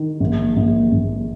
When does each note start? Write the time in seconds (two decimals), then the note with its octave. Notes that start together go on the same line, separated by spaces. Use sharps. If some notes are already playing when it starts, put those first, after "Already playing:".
Already playing: D#3
0.20 A#1
0.56 A#1
0.92 A#1